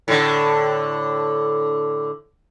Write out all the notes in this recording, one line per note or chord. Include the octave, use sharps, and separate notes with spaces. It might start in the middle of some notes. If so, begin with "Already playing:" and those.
A2 D3